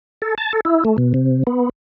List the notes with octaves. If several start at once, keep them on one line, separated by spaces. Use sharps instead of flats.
A4
A5
A4
E4
A3
B2
C3
B3